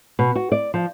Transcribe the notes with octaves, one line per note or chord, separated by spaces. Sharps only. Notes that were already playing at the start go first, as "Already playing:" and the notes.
B2
F#4
D5
F3